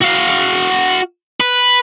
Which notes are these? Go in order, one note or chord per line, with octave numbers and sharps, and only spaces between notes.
F#4 F5
B4